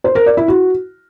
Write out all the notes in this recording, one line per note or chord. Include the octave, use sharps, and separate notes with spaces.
C5
A#4
D5
E4
F#4